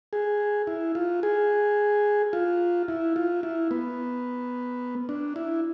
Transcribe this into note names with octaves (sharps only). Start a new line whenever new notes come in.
G#4
E4
F4
G#4
F4
E4
F4
E4
B3
D4
E4